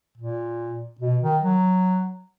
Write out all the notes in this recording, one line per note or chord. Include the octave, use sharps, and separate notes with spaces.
A#2
B2
D#3
F#3